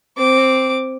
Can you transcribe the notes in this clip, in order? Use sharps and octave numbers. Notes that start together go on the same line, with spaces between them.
C4 D6